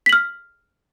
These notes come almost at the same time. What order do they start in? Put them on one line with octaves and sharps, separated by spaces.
B6 F#7 F6